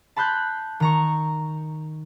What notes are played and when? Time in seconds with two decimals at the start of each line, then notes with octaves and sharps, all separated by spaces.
0.16 A5 B5 C6 F#6 G6
0.80 D#3 A#5 C#6